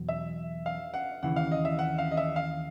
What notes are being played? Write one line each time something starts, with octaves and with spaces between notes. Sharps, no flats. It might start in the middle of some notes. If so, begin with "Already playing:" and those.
Already playing: E2 B2 F#3
E5
F5
F#5
D#2 C#3 E3 F#5
F5
D#5
E5
F#5
F5
D#5
E5
F5